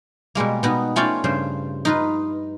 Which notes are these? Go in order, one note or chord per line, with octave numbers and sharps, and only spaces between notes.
B2 G3 G#3 A#3
B2 B3 D#4
A3 C#4 F4 C#5 D5 G5
G2 C#3 C5
D#4 F4 B4